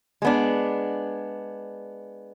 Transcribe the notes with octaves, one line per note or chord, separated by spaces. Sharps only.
G#3 B3 D4